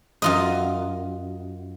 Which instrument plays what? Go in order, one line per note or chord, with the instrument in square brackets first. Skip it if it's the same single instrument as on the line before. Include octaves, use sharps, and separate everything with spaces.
[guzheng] F#2 F4 D#5